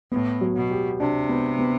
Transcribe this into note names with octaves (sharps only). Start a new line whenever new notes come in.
A2 B3
F#3
B2
G4
C3 D4
B3
B3